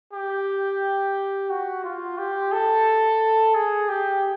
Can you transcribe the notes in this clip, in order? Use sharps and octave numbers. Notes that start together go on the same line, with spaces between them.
G4
F#4
F4
G4
A4
G#4
G4